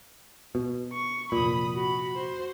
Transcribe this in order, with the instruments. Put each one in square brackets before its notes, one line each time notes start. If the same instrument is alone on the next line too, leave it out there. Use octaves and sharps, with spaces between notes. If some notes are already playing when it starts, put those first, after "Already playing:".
[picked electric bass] B2
[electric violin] C#6
[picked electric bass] F1 A#2 [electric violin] B5 D#6
[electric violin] F#4 B5
F#4 C5